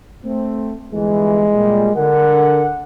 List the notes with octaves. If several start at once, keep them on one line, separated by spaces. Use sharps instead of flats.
A3 C4
G1 E3 G#3
A#2 G3
D3 A#4 F#5